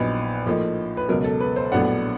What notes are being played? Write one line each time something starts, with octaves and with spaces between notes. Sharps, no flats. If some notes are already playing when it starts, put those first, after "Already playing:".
Already playing: A#1 A#2 F#3 B3 D#4 B4
A2 F3 A#3 D#4
B4
C#2 B2 F#3 A#4
A4
B4
C5
A#1 A2 F#3 B3 D4 F#5